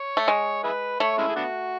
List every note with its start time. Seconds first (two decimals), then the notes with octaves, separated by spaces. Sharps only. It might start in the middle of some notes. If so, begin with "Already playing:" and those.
Already playing: C#5
0.17 A3
0.28 G#3
0.63 E4 G#4 B4
1.00 A3 C#5
1.18 G#3 C#4 E4
1.28 G#4
1.36 B3 D4 F#4